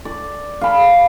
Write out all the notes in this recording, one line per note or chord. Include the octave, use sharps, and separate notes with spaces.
D5
F5 B5